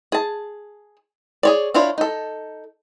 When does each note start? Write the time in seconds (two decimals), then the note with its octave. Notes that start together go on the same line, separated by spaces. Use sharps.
0.12 G#4 A5
1.43 G#4 C#5 D5
1.74 D4 E4 F4 C5 C#5
1.98 D#4 A4